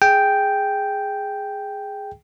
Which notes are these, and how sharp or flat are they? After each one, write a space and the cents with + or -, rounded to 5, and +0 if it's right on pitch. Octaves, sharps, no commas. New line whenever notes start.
G#4 +0 G5 +0